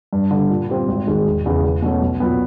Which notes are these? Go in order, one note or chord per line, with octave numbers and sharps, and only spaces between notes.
G2
D3 G3
A#2
G3 C4 F4
G#1
G#2 D#3 G#3
E1
E2 C#3
E2
B2 F#3 A3 C#4
B1
A#2 F#3 B3